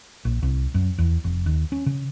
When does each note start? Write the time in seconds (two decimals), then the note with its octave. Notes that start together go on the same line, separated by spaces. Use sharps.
0.25 A#1
0.42 C2
0.74 F#2
0.98 E2
1.24 F1
1.46 D#2
1.72 C#4
1.86 C#3